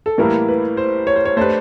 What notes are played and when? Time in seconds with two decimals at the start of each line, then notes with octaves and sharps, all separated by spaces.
0.06 A4
0.18 A2 E3 G3 A#3 A#4
0.48 B4
0.77 C5
1.07 C#5
1.16 C5
1.25 C#5
1.37 A3 D4 G4 B4 C5